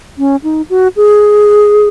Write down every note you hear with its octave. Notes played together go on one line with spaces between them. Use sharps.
C#4
D#4
F#4
G#4